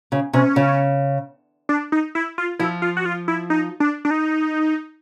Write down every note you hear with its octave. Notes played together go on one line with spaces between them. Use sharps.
C#3
C3 C#4
C#3
D4
D#4
E4
F4
F3 E4
F4
F#4
F4
E4
D#4
D4
D4
D#4